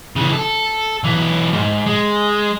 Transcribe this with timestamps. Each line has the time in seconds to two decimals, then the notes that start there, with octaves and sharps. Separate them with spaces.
0.16 C#3 E3
0.33 A4
1.04 B1 E3
1.53 G#2
1.87 G#3